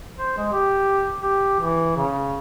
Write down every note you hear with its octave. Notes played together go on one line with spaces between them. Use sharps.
C5
G#3
G4
G4
E3
C#3